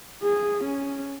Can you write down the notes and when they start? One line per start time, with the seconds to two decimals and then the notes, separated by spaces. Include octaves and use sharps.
0.23 G#4
0.64 C#4